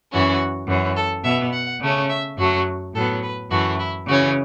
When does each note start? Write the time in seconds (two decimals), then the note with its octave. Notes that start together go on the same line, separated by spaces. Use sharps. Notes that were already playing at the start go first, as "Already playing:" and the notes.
0.11 F#2 E3 C#4 F#4
0.68 F#2 E3 C#4
0.96 A4
1.24 B2 B3 E5
1.52 F#5
1.81 C#3 A3 C#4
2.09 E5
2.37 F#2 F#3 A3 F#4
2.94 A2 F#3 B3 A4
3.22 B4
3.50 F#2 E3 A3 F#4
3.79 E4
4.07 C#3 E3 C#4 F#4